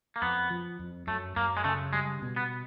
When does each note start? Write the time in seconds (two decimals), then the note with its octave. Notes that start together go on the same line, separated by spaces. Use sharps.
0.16 A#3
0.22 F2 B3
0.50 F3
0.79 F2
1.07 F#2 A3
1.36 F#2 A#3
1.57 G#3
1.64 C#3 A3
1.93 G3 G#3
2.22 B2
2.36 B3